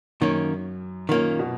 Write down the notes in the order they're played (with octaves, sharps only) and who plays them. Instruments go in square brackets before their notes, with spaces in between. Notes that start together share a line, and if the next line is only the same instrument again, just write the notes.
[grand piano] F#2 [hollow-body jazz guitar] D#3 A#3 C#4
[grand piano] A#2 [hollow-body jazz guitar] D#3 A#3 C#4
[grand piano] B2